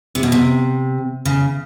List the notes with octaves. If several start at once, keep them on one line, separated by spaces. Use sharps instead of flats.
C3
B2
C3
C#3